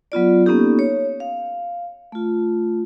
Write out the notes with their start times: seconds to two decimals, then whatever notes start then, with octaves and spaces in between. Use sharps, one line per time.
0.12 F#3 B3 F4 D5
0.45 A#3 B3 C#4 D#4 G4 A4
0.79 C#5
1.20 F5
2.12 A3 F4